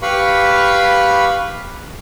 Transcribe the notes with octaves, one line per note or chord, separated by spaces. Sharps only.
G4 B4 F5 B5 C#6